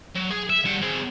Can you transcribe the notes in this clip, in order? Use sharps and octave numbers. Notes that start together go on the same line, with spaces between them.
F#3
G#4
E5
G3 F#5
C4 G#4